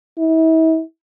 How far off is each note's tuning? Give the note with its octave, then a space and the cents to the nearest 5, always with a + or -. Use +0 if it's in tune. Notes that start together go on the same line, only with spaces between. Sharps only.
E4 -40